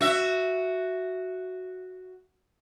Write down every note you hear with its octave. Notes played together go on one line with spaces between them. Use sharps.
F#4 E5